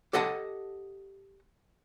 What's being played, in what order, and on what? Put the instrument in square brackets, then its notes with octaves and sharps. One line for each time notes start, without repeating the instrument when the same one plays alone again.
[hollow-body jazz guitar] G4 A4 D#5 F#5 A5